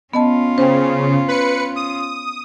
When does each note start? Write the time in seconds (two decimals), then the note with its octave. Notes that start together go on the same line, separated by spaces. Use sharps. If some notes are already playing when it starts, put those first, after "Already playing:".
0.13 B3 C#4 F4 D#5 A5
0.58 C#3 C5 G5
1.28 B4 C#7
1.76 D#6